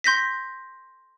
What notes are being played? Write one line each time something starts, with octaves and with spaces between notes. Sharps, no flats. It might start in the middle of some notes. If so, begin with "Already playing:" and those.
C6 G6 A#6 B6